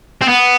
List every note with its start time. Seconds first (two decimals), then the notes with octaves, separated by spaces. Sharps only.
0.22 C4
0.29 B3